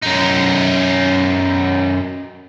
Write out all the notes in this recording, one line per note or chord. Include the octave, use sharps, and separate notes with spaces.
F#2 D#4